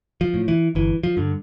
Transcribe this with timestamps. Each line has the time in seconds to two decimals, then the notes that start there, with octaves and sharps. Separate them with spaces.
0.21 F3
0.34 A2
0.48 E3
0.75 G1 E3
1.03 F3
1.17 G2 D3